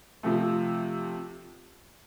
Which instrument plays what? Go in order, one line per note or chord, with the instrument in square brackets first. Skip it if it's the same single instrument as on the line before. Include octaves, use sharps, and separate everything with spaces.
[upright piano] C3 F3 A3